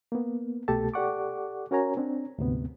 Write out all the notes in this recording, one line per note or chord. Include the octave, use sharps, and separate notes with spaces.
A#3 B3
C2 B2 A3 G4 A4 A5
G4 A4 D5 F#5 C#6 D6
C#4 F#4 A#4 C#5 G#5 A#5
C4 D4
D2 G#2 C3 B3